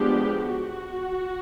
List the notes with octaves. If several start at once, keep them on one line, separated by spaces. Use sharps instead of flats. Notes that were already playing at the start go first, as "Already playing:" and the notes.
Already playing: F3 G#3 B3 D4 G4
F#4